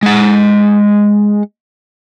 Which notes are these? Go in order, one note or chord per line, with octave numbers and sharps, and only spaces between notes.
G#3 F#5